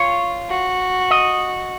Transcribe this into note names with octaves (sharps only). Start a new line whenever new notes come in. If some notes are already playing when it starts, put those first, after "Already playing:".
Already playing: F4 C#5
F#4
D#5